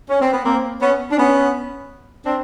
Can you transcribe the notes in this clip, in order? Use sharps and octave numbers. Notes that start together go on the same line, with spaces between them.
C#4
C4
B3
A#3 C4
B3 C#4
D4
B3 C#4
C4 D4